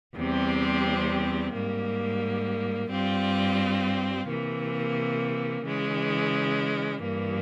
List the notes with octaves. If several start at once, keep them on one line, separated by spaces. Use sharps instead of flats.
E2 C3 G3 C4
G#2 G3 A#3
G2 G3 C4 F4
C3 E3 A#3
C#3 E3 G#3
G2 E3 A#3